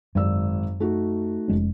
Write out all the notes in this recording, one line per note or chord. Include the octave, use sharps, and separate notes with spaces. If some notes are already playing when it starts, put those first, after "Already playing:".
G#1 F#2 D5 E6
A3 D#4 F#4
F1 G#3 C#4